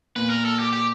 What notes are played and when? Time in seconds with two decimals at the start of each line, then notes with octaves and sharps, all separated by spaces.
0.16 A#2 B4
0.30 A#4
0.45 A4
0.59 G4
0.73 G4